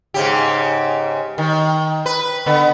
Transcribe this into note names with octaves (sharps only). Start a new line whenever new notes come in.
G#2 C#3 G4
D#3
B4
D3 B3